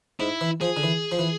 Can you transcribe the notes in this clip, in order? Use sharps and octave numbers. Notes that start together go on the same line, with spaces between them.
G#2 E4
E3
F3 G#4
D3
E3
F3
E3